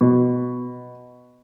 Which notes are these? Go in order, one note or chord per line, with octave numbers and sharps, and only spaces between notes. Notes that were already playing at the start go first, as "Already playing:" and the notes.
B2